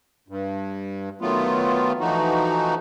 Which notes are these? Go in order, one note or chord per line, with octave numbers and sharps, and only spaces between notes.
G2
D#3 F#3 A3 B3 F4
E3 F3 A3 D#4 F#4